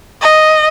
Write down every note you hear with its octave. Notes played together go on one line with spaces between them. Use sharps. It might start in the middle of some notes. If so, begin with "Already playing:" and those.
D#5